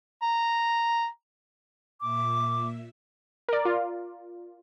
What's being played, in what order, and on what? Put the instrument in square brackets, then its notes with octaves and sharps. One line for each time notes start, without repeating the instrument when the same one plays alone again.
[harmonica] A#5
[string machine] A#2 E5 [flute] D6
[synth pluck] A#4 D5
F4